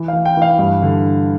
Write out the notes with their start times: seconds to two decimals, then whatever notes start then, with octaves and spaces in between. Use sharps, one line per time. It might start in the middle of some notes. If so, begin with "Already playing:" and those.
Already playing: E3
0.08 F5
0.13 E3
0.25 G5
0.37 E3 F5
0.59 G2
0.82 D3